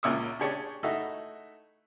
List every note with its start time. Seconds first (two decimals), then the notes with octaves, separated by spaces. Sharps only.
0.03 C#2 A#2 E4 C#5 E5 D#6
0.39 D4 G4 G#4 C#5 A5
0.83 A3 D#4 E4 F#4